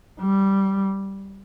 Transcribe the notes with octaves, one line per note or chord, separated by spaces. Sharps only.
G3